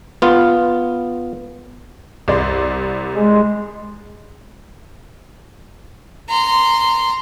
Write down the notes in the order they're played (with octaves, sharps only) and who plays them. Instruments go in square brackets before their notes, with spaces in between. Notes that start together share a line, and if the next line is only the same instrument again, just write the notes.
[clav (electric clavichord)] B3 F4
[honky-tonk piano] C2 D5 C6
[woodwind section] G#3
[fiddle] A#5 C6